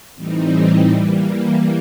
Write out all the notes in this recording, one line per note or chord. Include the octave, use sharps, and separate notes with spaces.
A2 E3 G3 C4 D#4
E3 G3 A#3